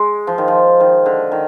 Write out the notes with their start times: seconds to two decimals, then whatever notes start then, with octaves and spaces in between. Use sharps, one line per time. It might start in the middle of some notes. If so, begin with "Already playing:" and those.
Already playing: G#3
0.27 F3
0.38 D#3
0.48 F3
0.80 D#3
1.06 D3
1.32 D#3